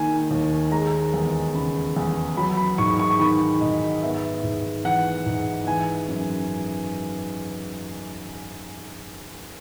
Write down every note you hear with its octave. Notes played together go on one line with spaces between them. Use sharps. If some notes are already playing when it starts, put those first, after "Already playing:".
Already playing: D#3 A#3 G#5
D#2
G#3 A#5
E2
C#3 B5
E2
F#3 B5
B5
G#2 C#6
C#6
C#6
D#3 B5
G#2 D#5
B3 E5
G#2
E3 F#5
G#2
E3 G#5
F#2